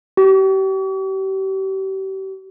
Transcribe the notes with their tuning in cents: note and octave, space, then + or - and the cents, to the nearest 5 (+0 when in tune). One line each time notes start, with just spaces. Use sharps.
G4 -35